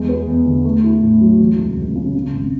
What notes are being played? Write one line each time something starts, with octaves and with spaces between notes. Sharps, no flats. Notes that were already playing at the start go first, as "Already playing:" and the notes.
Already playing: E2 G#3
B3
E2
D3
A3
E4
A2
F#3
E3
C#2
C#2
C#3
C#3
G#1